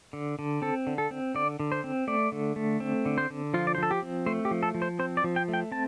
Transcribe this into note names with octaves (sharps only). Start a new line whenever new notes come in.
D3
D3
C4 A4
D3
A4
C4
D3 D5
D3
C5
C4
A3 D5
D3
A3
C4
D3
C5
D3
F3 F4
D5
C5
F3 A4
G4
C4
A3 C5
G4
F3
A4
F3
C5
C4 C5
D5
F3
G5
A3
G5
C4 A5